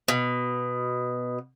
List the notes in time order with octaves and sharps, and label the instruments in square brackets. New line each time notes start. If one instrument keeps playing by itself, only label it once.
[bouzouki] B2